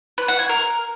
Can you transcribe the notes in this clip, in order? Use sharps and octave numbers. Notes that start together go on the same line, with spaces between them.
B4
F#5
G#5
A#4